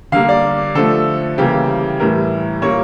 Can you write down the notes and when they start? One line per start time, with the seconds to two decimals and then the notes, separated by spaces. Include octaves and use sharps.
0.12 D3 G3 A#3 F5
0.29 D5
0.75 D3 F3 A3 A4
1.38 C#3 E3 G3 A#3 G4
2.00 A2 E3 G3 A#4
2.62 A#2 G3 A#3 C#5